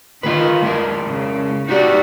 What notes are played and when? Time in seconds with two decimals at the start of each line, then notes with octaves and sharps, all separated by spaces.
0.23 D#3 F4 B4
0.63 G#3 E4 A#4
1.05 C#3
1.69 D#4 F#4 G4 D5